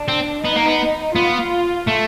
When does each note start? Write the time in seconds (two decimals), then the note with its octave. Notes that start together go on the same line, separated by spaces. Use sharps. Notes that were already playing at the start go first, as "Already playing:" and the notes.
Already playing: D4
0.08 C4
0.44 B3 D#4
0.55 A#3
0.66 B3
1.15 B3 F4
1.87 A3